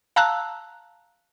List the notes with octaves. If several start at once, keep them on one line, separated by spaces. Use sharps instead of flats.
F5 A5 A#5 E6 F#6